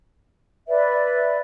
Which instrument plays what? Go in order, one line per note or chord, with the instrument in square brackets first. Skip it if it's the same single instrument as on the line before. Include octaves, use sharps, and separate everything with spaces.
[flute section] B4 D5 E5